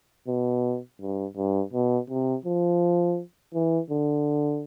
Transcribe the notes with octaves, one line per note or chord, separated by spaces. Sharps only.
B2
G2
G2
B2
C3
F3
E3
D3